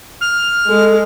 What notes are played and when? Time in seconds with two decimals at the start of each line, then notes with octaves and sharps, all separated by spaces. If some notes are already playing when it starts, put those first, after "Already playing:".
0.21 F6
0.68 G#3 A4